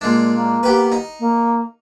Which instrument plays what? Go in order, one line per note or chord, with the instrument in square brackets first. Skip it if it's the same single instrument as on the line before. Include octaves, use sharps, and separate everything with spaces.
[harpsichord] A#2 G#3 D4
[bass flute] A#3
[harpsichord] B3 G4 B4
D#4
[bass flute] A#3